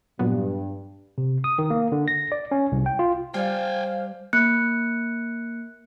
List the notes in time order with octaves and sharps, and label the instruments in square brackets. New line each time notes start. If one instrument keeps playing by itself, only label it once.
[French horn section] G2 [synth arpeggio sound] A#2 F#3 B3
[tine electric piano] C3
D#6
D#3
A#3
D3
A#6
D5
C#4
C2
G5
F4
[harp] G3 D5 [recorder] C5 [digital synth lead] F5 [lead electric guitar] G5 G#5
[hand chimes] A#3 F#6 C#7